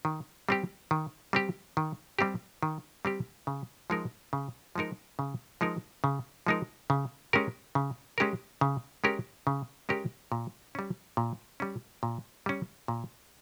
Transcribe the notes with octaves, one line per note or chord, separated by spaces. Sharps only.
D#3
G3 C4 G4
D#3
G3 C4 G4
D#3
G3 C4 G4
D#3
G3 C4 G4
C#3
F3 G#3 D#4 A#4
C#3
F3 G#3 D#4 A#4
C#3
F3 G#3 D#4 A#4
C#3
F3 G#3 D#4 A#4
C#3
G#3 C#4 G4 A#4
C#3
G#3 C#4 G4 A#4
C#3
G#3 C#4 G4 A#4
C#3
G#3 C#4 G4 A#4
A#2
G3 C#4
A#2
G3 C#4
A#2
G3 C#4
A#2